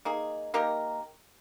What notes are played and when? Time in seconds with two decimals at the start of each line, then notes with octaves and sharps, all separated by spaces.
0.05 A#3 D#4 G#4
0.54 A#3 D#4 G4 A#4